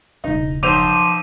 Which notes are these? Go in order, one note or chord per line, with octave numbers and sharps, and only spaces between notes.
E1 C#2 D#4
B1 F3 C5 D6 D#7 F7